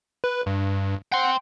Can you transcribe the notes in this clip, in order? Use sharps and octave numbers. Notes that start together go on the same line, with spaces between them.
B4
G2
F#5 G5 C6